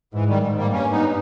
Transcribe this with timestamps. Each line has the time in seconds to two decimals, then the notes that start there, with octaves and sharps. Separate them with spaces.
0.13 G#2 E3
0.28 D#3 G3
0.42 G#2
0.57 G3 A#3
0.72 G2 A#3 C#4
0.91 B3 D#4